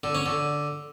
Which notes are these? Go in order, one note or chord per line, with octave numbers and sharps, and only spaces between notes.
D3
C#4
D3